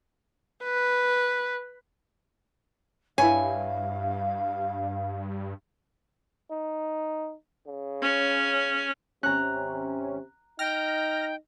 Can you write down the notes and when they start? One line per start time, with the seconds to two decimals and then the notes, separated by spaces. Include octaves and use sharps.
0.64 B4
3.18 G2 E4 B4 C#5 F5 G#5
6.51 D#4
7.67 C#3
8.02 C#4
9.23 G#1 C3 C#4 A#5 F#6
10.59 D#4 G5 F6 A#6